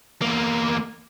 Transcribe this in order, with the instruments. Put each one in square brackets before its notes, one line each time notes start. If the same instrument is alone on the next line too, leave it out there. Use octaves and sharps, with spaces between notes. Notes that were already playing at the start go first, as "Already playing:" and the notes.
[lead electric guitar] E2 A#3